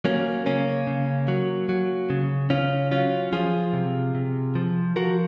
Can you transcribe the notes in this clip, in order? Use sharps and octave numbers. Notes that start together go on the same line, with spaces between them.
F#3 A#3 C#4
C#3 A#3 C#4
C#3
F#3
F#3
C#3
C#3 C#4 F4
F#3 C#4 F4
F3 F4 G#4
C3
C3
F3
F3 F#4 A#4